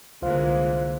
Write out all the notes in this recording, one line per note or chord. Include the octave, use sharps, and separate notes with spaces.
C2 D3 E3 G#3 A#3 F4 C5 F5